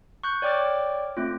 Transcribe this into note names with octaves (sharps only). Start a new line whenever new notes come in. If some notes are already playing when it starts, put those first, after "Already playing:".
C#6 F#6 G6
C#5 D5 G5 D6 F6 A6
A3 C4 F4